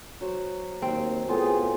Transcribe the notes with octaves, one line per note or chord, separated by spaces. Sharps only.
F#3 C5
D#2 C4
A2 B3 F4 G#4 G5